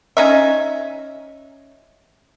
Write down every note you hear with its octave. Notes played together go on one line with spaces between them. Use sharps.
C#4 D#4 E5